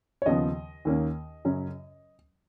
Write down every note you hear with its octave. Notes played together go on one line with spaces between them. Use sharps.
C#5
D#2 C#3 F3 B3 D#5
D#2 D#3 A#3 C#4
F#2 C#3 F#3 C#4